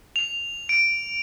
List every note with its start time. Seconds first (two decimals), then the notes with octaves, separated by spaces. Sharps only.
0.16 F7
0.69 D7